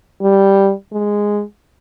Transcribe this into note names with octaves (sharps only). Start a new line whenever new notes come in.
G3
G#3